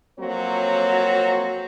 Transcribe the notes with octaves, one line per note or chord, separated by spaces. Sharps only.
F2 F#3 A#3 C4 F#4 C#5